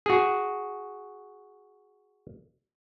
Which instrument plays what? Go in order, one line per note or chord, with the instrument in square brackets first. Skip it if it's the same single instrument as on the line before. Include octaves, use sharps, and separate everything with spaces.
[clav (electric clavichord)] F#4 G#4